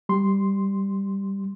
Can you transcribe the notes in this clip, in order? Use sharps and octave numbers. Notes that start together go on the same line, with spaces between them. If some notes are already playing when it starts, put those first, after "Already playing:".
G3 C6